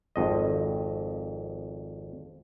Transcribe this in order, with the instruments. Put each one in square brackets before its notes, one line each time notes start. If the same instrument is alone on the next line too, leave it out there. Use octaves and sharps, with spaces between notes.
[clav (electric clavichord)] G#1 F2 D#5